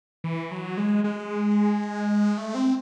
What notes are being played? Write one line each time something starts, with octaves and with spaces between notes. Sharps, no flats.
E3
F#3
G#3
G#3
A3
C4